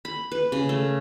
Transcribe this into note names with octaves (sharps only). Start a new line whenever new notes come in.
B5
B4
C#3
A3